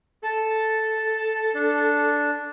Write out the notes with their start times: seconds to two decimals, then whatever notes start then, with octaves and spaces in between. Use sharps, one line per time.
0.23 A4 A5
1.55 D4